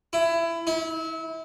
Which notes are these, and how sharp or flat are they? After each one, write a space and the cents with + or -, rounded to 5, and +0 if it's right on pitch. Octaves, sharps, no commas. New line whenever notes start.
E4 +20
E4 -30